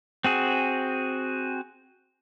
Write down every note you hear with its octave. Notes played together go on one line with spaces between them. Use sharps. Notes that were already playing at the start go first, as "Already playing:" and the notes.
C4 F#4 G#4